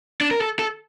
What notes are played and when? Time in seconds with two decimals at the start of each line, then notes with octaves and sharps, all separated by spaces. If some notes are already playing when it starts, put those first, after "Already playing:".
0.21 D4
0.31 A#4
0.41 A4
0.59 A4